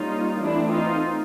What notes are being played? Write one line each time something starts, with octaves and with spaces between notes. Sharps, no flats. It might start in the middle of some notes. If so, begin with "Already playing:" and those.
Already playing: G3 A#3 C#4 D#4 F4
E3 A3 C4 D4 E4
D#4 F4